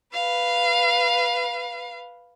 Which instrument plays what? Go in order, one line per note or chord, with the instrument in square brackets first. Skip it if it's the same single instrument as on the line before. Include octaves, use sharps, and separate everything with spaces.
[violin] B4 F5